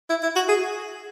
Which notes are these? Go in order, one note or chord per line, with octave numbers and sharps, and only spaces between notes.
E4
E4
F#4
G#4